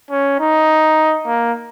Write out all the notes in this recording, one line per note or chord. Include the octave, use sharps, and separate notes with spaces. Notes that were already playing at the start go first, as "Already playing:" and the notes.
C#4
D#4
A#3